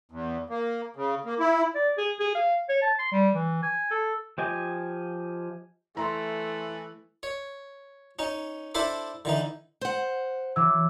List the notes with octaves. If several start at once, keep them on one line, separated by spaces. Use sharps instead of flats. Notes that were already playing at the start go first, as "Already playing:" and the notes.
E2
A#3
C#3
A#3
E4
D5
G#4
G#4
F5
C#5
A5
C6
G3
E3
G#5
A4
F3 G4 D#5 G#5
E3 A3 A#5 C6
C#5
C#4 D#4
D4 E4 A4 C5 B5 D6
D3 E3 D#4
C5 F#5
E3 F#3 D6 E6